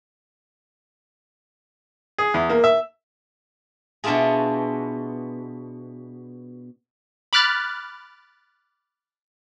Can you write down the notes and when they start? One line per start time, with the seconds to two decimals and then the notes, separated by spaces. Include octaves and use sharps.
2.18 G#4
2.34 E2
2.50 A#3
2.64 E5
4.04 B2 B3 D4 E4 F4 G#4
7.33 B5 D6 F6 F#6 A6